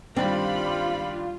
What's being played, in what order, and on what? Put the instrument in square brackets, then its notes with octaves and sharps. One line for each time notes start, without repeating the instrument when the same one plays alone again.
[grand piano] G2 D#3 D4 [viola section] G3 D5 B5 [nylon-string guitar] C4 [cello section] F4